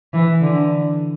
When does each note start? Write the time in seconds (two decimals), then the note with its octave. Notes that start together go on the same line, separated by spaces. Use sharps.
0.13 E3
0.42 D3